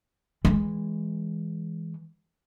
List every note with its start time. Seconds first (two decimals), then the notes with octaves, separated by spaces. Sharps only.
0.45 E3 G#3